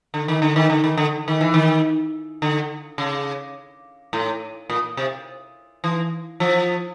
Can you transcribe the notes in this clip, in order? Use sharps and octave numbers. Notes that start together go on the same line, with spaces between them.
D3
D#3
D3
D#3
D3
D#3
D3
D#3
E3
D#3
D3
C#3
A2
A#2
C3
E3
F3